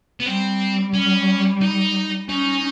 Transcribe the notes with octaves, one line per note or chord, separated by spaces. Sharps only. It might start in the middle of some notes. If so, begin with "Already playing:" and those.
B3
G3 C4
C#4
D#4
C#4 D#4